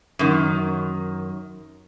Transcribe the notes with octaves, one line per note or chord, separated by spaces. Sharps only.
F#2 D#3